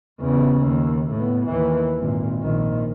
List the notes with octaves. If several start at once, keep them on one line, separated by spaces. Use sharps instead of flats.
E2 C#3
D#2
A2 B3
D#2 E3
G#1 A#2
A#1 D#3